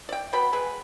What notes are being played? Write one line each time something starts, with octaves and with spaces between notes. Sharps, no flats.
D5 G5
B2 B3 G5 B5
G#3 G#4 B4